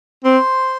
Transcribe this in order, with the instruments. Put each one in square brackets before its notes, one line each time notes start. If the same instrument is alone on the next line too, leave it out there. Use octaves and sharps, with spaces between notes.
[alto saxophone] C4 [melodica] C5 C6